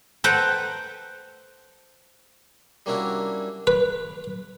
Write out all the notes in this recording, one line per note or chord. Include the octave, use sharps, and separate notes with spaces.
A4 B4 C5 G5 A5 A#5
G3 A#3 C#4 D4 E4 F#4
B4